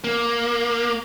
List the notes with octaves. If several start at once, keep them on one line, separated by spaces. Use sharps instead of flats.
A#3